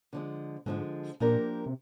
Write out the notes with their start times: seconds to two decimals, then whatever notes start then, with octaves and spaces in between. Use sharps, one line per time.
0.13 D3 F3 G#3
0.66 G#2 D3 F3 G#3
1.20 A#2 F3 A#3 D4 G4 A#4
1.66 C3